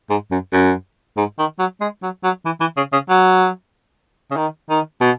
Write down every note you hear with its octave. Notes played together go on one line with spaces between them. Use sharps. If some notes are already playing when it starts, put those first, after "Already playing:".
G#2
F#2
F#2
G#2
D#3
F#3
G#3
F#3
F#3
E3
E3
C#3
C#3
F#3
C#3
D#3
D#3
B2